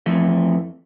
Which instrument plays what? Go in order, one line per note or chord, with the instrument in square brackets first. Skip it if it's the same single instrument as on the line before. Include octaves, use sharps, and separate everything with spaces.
[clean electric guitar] F2 E3 A3